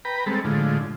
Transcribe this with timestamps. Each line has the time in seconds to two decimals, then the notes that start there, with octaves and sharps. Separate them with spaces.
0.05 B4 G5 A#5 B5
0.26 G3 G#3 C4 A4
0.44 A2 D3 F3 G#3